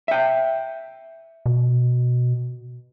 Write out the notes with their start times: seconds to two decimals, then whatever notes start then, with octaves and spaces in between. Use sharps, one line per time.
0.08 E5 G5
1.46 B2